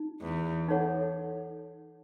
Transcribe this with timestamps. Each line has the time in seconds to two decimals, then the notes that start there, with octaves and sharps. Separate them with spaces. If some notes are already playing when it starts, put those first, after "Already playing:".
Already playing: D#4
0.21 E2
0.68 D#4 A4 C#5 F#5